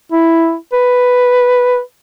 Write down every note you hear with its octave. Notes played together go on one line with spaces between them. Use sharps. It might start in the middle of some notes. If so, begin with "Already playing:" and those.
E4
B4